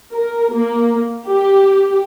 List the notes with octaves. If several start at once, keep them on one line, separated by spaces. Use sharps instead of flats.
A#4
A#3
G4